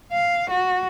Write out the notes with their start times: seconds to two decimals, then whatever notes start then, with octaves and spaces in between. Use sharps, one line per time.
0.12 F5
0.50 F#4